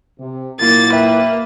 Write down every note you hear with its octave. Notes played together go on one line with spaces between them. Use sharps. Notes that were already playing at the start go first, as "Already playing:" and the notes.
C3
A#2 F#3 A#3 E4 A6
B4 E5 G5